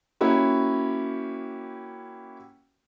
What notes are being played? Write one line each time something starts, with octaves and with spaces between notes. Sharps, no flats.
A#3 C#4 E4 F#4 G4